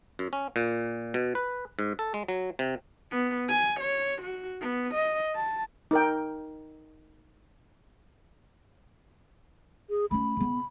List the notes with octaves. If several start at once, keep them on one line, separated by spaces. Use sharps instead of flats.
F#2
C#4
A#2
B2
B4
G#2
A4
G#3
F#3
C3
B3
G#5
C#5
F#4
B3
D#5
A5
D#4 A#4 G5
G#4
A3 C#4 B5
C#3 B3